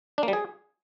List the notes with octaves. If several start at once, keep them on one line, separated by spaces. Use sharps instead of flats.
D4
A#3
G3
G#4